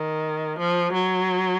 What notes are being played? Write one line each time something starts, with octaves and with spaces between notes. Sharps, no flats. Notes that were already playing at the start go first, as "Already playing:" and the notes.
Already playing: D#3
F3
F#3